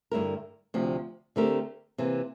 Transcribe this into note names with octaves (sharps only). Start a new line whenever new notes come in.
G2 D3 A3 E4 A#4
D2 C3 F3
D3 A3 C4 G4 A#4
C3 E3 A#3